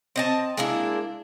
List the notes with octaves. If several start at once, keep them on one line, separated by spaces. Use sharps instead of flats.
C4 D#5 A5
G#3 A#3 D4 E4